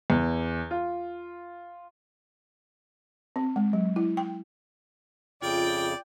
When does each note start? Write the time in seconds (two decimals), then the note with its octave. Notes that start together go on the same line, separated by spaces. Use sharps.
0.10 E2
0.71 F4
3.36 C4
3.56 G#3
3.73 F#3
3.96 E4
4.17 G5
5.42 F2 C#3 F4 D5 G5